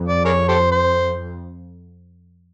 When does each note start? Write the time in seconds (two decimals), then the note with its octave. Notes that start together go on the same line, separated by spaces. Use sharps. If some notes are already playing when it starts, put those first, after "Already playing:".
Already playing: F2
0.09 D5
0.25 G#4 A#4 C#5
0.48 G4 A4 C5
0.72 C5